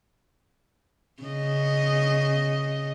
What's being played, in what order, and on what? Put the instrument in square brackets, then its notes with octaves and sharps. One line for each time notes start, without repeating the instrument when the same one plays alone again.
[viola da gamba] C#3 D#5